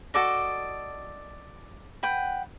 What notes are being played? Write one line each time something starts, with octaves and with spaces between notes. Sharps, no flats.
F#4 A4 D5 D#5
B4 F#5 G5